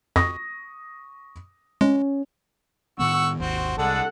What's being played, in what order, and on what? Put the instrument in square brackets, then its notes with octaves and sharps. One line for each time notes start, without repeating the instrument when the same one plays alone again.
[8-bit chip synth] F2 [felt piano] C#6 D#6 A#6
[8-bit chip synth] G#3 [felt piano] C#4
[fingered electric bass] A2 D#3 B3 [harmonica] F#5 C#6 E6
[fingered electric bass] G#1 D#2 [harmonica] C4 F#4
[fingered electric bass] C2 [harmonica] G#3 D4 [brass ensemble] A4 F#5